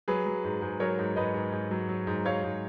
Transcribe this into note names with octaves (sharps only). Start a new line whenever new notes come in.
F#3 G#4 B4
F#3
G#2
G#2
F#3 A#4 C#5
G#2
G#2 B4 D#5
G#2
G#2
F#3
F#3
G#2
F#3 C#5 F5
G#2